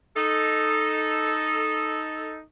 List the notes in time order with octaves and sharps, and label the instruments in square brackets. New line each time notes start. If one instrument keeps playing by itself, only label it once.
[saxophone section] D#4 A4